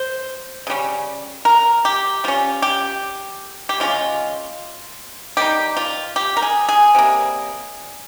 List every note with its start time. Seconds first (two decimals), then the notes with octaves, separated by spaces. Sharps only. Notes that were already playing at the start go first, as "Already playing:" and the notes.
Already playing: C5
0.67 C#3 G3 C#4
1.45 A#4
1.85 G4
2.24 G3 C#4 F4
2.62 G4
3.69 G4
3.80 C#3 G#3 C#4 F4
5.37 D#3 G3 A#3 D#4 G4
5.77 F4
6.16 G4
6.37 A#4
6.42 G#4
6.69 G#4
6.95 C3 G3 A#3